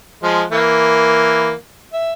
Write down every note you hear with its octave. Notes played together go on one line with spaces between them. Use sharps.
F3 G#3
E3 A#3
E5